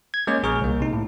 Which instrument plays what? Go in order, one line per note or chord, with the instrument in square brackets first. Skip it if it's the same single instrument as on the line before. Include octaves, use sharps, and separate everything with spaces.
[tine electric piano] G#6
G#3 A#3 C#4 G#4 C#5
A#1 G#4 A#5 C#6 F6
C2 A#3
C3 D#4
A2